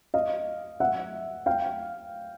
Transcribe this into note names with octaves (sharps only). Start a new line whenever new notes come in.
D#5 F5
E5 F#5
F5 G5